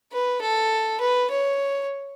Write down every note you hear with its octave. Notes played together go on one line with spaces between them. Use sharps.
B4
A4
B4
C#5